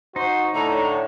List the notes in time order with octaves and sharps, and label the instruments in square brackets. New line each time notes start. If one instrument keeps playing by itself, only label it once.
[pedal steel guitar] D#4 [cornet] F#4 [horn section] C5
[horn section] A2 D3 [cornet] C#5 [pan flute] A#5